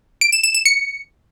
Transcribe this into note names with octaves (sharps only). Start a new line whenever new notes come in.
D7
E7
E7
E7
C#7